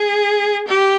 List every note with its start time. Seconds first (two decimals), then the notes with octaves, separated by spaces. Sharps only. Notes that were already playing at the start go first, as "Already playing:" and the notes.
Already playing: G#4
0.68 G4